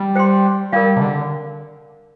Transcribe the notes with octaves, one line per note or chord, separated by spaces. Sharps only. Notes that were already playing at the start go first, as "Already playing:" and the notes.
Already playing: G3
C5 G5 C6
G3 A#4 D5 F5
C3
D3